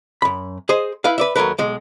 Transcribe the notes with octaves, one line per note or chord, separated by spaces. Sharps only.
F#2 B5
G#4 C5 D#5
E4 B4 F5
B4 D5 E5
D#2 F#3 A3 A#4 B4
B1 G#3